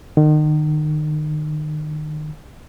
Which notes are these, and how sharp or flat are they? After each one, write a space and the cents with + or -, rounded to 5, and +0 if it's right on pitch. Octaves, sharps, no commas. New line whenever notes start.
D#3 -35